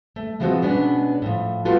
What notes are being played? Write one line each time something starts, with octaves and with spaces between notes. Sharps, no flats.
A3
E3 F3 G#3 A3 C4 F#4
B2 G#3 B3 C#4 D4
A2 F3
G3 B3 F4 F#4 A4